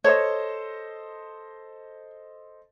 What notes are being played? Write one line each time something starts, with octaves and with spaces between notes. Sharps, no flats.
A4 C5 C#5 D#5